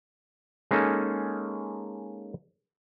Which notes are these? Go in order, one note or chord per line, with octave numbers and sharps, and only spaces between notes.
G#3 A#3 C#4 D#4 A4